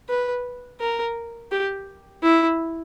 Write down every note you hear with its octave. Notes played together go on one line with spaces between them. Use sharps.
B4
A#4
G4
E4